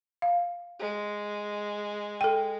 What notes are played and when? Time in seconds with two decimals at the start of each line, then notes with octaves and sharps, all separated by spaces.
0.22 F5
0.79 G#3
2.21 A4 G5